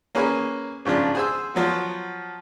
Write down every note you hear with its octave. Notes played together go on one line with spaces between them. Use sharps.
A#3 C#4 G#4 B4
G#2 C#3 F3 D4
G#4 C5 E6
F3 F#3 B3 F#4